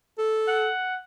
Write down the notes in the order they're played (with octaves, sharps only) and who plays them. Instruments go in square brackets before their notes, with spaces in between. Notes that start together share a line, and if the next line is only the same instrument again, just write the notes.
[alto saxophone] A4
[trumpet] F#5